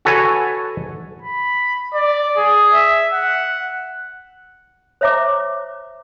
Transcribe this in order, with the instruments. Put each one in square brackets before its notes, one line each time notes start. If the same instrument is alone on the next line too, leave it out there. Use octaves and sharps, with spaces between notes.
[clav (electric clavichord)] F#4 A4 B4 C#5 G#5
[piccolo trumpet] B5
D5
G#4
E5
F#5
[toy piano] C5 C#5 E5 A#5 D6